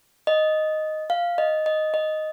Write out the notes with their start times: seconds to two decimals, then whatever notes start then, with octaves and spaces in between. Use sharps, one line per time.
0.27 D#5
1.10 F5
1.38 D#5
1.66 D#5
1.94 D#5